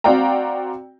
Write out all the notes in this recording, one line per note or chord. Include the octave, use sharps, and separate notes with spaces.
C4 F#4 D5 F5 G5 A#5